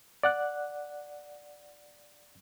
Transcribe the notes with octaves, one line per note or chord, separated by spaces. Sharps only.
D5 F#5 F#6